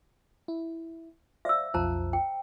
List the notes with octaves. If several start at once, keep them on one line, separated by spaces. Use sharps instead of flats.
E4
C5 D5 E5 F5 E6
B1 F2 F4 C5 A5 A#5
G5